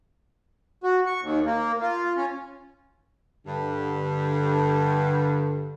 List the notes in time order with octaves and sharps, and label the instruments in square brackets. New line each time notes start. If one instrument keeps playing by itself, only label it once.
[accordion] F#4
C#6
D#2
A#3
F4
C#4
[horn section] G2 [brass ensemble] D3